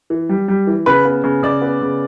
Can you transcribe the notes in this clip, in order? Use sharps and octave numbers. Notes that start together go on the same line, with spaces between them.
E3
G3
G3
E3
C#3 B4
B3
C#3
C#3 D5
B3
C#3